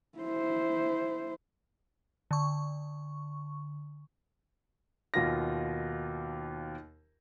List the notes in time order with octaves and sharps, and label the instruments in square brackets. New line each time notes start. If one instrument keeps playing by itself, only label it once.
[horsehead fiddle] E4 C5
[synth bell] D3 C#6
[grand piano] D#2 B2 F4 A#6